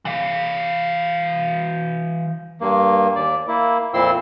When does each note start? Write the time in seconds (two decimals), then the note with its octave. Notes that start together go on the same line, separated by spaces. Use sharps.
0.05 E3 F5
2.60 G2 A#3
3.16 D#2 D5
3.48 A#3 E4
3.94 F2 A#2 C4 E4 C6 E6